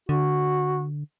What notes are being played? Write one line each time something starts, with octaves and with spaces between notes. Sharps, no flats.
D3 F#4